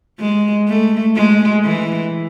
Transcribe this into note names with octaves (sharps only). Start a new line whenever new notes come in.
G#3
A3
G#3
E3